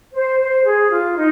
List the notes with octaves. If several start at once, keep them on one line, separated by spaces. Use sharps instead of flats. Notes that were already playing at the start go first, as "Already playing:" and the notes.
C5
C5
G#4
F4
D#4